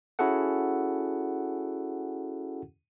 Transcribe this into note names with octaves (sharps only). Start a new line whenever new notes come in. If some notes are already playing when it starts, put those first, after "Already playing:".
C#4 E4 F#4 G#4 A4 F#5